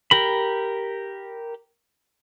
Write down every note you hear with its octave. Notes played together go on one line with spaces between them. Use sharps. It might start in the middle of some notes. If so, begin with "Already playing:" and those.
G4 A#4 B5